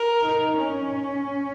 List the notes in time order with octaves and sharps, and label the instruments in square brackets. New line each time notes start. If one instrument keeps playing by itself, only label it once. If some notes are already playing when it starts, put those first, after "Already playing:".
Already playing: [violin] A#4
[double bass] D#4
C#4